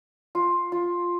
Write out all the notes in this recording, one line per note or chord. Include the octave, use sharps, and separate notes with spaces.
F4
F4